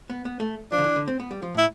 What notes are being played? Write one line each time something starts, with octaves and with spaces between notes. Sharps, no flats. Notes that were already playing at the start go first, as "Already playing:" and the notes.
B3
B3
A3
F3 D4
D3
E3
D3
C4
B3
G3
F3
A2 E4